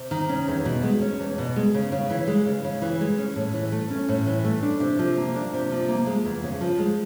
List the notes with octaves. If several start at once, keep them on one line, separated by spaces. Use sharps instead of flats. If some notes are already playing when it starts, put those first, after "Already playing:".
Already playing: C3
D#3
C#4
E2
B2
G#3
C#4
E2
B2
G#3
C#3
C#3
E3
G#3
C#3
C#3
E3
G#3
C#4
A2
E3
A3
C#4
A2
E3
A3
D4
C3
F3
A#3
D4
C3
F3
A#3
G#3
E2
C#3
F3
G#3